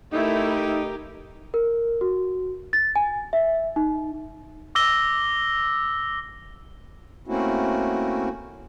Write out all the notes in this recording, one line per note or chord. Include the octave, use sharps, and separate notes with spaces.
A3 D#4 E4 G4 A#4
A#4
F#4
A6
G#5
E5
D#4
D6 E6 A#6 G7
A3 A#3 C4 C#4 E4 F#4